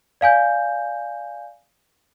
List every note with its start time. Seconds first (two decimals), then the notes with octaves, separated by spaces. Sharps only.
0.21 D5 F5 G#5 G6